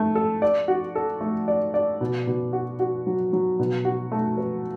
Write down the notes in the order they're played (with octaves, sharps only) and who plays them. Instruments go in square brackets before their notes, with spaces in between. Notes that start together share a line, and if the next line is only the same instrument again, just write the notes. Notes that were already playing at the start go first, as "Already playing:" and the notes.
Already playing: [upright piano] A3
A4
D5
F#4
A4
A3
D5
D5
B2
B2
F#4
F#4
F#3
F#3
B2
F#4
A3
B4